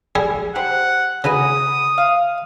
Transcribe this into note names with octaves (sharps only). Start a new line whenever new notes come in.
G3 E4 G#4
G4 C5 F#5
C#3 F#4 B4 G#5 D#6
F5